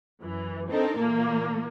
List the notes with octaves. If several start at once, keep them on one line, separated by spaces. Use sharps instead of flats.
F#2 E3
C4 D4 D#4 A4 A#4
A#2 E3 A#3